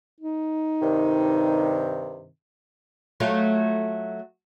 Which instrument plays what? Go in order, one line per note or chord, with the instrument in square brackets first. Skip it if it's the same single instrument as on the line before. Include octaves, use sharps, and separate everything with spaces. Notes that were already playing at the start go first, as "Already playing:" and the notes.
[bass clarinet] D#4
[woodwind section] G2 C3 D#3
[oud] F#3 A3 F4